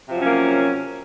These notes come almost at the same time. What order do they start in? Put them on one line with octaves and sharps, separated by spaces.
C3 F3 F#3 C#4 A#3